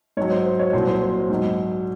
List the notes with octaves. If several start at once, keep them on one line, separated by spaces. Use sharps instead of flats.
G#2 F#3 C#5
C5
C5
C#5
C2 A#2 F#3 C5
C5
C5
G#2 F#3